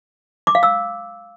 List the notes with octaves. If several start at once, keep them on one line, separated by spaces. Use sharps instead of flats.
D6
F5
E6